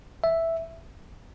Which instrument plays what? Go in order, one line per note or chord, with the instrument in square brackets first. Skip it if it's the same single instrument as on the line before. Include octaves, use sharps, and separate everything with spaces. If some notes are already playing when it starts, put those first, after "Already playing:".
[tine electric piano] E5